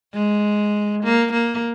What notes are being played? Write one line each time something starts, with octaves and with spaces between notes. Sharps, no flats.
G#3
A#3
A#3